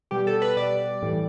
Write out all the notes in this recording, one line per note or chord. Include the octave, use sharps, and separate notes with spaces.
B2 G3 G4
A4
B4
B2 G3 D5
A2 E3 G3